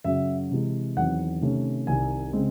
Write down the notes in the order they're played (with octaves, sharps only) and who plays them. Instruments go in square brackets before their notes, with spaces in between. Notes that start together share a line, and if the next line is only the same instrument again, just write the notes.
[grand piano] F#2 C#3 F#3 E5
C3 E3 G#3
E2 D#3 F#3 C4 F#5
C3 D#3 A3 C#4
C2 C3 D#3 G#5
C#3 G#3 C4